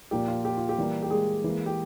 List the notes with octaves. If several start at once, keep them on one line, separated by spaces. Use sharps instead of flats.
A#2 F3 A#3 G4
F4
G4
F4
G4
E3 G3 A#3
G4
G#3 G#4
E3 A#3
G4